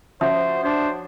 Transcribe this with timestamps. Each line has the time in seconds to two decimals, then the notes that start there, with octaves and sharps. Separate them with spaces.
0.21 F3 C#4 F#4 C5 E5
0.64 D4 C5